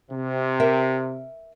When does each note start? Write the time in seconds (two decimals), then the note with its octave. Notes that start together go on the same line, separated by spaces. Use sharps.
0.10 C3
0.60 A#4 E5